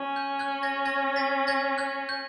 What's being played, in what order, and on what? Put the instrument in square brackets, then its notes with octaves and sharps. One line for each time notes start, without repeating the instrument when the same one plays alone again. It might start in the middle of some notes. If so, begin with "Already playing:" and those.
Already playing: [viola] C#4
[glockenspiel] G6
F#6 G#6
G#6 A#6
G#6 A#6
A6 B6
G#6 A#6
F#6 G#6
G6